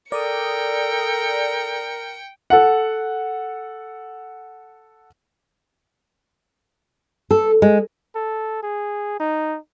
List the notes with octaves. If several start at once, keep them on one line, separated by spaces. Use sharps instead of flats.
A4 A#4 D5 G5 D#6 C#7
A4 F#5
A4
G#3
A4
G#4
D#4